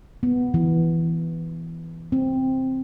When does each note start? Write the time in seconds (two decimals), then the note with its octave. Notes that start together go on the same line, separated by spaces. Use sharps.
0.23 B3
0.54 E3
2.12 C4